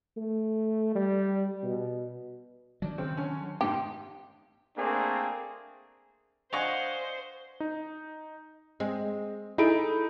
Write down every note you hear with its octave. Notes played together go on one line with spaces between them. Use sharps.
A3
G3
B2
D#3 F#3 D4
C#3 C4
D3 C#4
F2 G#2 G4
A3 A#3 C4 D4 G#4
D4 C5 D#5 F5 F#5 G#5 C#6
D#4
G#3 C4
D#4 E4 G#4 A4 B5 D7